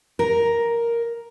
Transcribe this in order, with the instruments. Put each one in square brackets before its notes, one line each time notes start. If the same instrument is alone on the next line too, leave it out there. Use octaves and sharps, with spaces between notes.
[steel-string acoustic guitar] A#4